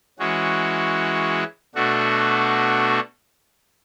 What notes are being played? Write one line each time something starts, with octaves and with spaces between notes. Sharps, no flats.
E3 G#3 C#4 F#4
B2 A3 D4 F#4